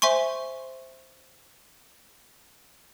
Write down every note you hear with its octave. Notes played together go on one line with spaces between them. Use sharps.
C5 E5 G#5 C6 C#6